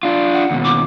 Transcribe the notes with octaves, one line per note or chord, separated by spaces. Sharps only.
D4 F4
F#5
D#2 B2
D6